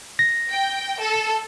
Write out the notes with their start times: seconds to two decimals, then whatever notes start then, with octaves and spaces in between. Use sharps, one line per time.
0.19 A#6
0.50 G5
1.01 A4